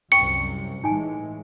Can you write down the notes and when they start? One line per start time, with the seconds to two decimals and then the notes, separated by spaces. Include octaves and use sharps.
0.12 C2 F#2 C3 G5 C6 C#6 C#7
0.84 A2 E3 G#3 D#4 G#5